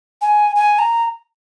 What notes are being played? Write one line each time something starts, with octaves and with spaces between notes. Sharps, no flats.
G#5
G#5
A#5